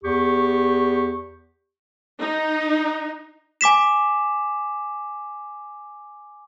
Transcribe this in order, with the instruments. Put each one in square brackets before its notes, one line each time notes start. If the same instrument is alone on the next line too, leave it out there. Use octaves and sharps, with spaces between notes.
[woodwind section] E2 G4 C#6
[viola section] D#4
[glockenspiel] G#5 D6 B6 E7